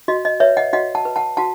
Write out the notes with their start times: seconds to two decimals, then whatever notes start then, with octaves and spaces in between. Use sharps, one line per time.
0.08 F#4 D#5
0.25 D#5
0.40 B4 C#5 E5
0.57 D#5 F#5
0.73 F#4 D#5 F#5
0.95 F#5 A5
1.05 B4
1.16 F#5 A5
1.37 F#4 F#5 A5